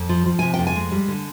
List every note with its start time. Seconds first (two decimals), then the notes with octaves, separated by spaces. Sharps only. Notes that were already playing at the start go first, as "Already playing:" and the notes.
Already playing: F2
0.09 F3
0.26 F3
0.39 C3 G#5
0.54 F2 G5
0.67 G#5
0.76 G#3
0.92 G3
1.08 D3